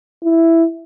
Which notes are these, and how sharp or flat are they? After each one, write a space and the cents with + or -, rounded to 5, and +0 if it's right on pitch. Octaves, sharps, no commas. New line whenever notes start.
E4 +5